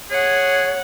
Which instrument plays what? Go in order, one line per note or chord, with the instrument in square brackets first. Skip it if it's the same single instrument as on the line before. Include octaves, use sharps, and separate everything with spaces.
[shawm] G#4 [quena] C#5 [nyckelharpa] F#5